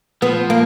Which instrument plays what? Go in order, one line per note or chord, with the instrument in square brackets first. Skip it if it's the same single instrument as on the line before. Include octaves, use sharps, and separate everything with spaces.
[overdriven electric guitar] F3 [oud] B3
[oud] A#3